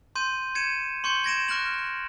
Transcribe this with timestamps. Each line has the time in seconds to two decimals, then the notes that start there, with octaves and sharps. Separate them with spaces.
0.15 C6 G6 D#7
0.55 G#6 C#7 D#7 E7
1.04 C6 C#6 G6 C#7
1.24 G#6 A#6 D7 E7
1.48 C#6 F6 F#6 A#6 F#7